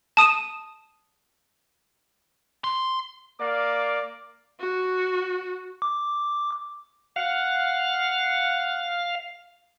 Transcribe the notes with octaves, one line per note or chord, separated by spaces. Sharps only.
A5 D#6 D#7 E7
C6
A#3 D5 F5 D6
F#4
D6
F5 F#5